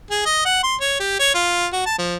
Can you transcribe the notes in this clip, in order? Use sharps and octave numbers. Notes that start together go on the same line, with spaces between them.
G#4
D#5
F#5
C6
C#5
G4
C#5
F4
F#4
A5
F3